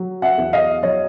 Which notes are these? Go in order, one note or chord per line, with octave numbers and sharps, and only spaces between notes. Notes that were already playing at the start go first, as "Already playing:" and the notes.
Already playing: F#3
E5 F#5
E2
D#5 F5
F#3 C#5 D#5